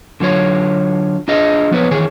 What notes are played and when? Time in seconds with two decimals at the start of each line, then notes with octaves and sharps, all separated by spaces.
0.20 D3 F#3 F4 C#5
1.28 D4 F4 G#4 D#5
1.71 F3 B3 B4 C#5
1.91 D#3 E3 G#4 C#5